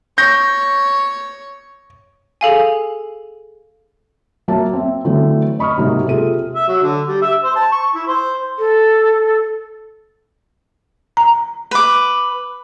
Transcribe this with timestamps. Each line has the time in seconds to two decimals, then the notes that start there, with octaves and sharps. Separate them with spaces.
0.18 C#5 G6 A#6
2.41 G#4 A4 F5 G#5
4.48 F#3 A#3 E5 A5
4.73 C4 E5
5.05 D3 E3 F#3 A3 C4
5.59 D#5 B5 C#6 D#6 F6
5.77 G#2 C3 F#3 A#3
6.06 C3 F4 G#4 A4 D#7
6.55 E5
6.68 F#3
6.83 D3
7.07 G3
7.22 E5
7.44 C5
7.56 A5
7.72 C#6
7.95 E4
8.08 C5
8.58 A4
11.17 A#5
11.71 B4 D6